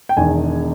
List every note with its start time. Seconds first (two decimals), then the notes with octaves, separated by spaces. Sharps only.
0.09 G5
0.17 E1 E2 D#3 G#5